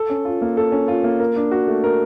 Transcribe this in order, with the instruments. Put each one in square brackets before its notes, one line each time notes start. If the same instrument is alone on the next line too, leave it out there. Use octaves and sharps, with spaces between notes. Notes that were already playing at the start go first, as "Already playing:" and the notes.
Already playing: [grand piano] A4
C#4
F4
A#3
A4
C#4
F4
A#3
A#4
D4
F#4
A3
A#4